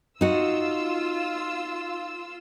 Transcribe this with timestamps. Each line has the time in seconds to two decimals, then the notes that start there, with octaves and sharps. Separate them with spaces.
0.21 D#4 F4 F#4 E6